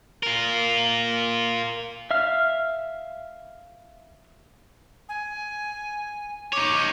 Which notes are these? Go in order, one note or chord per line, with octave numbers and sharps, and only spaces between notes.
F4 A#4
E5 F5 F6
G#5
D#4 C#5 D6